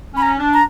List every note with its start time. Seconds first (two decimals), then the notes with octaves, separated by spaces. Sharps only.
0.14 C#4 B5
0.22 A#5
0.39 D4
0.54 A#5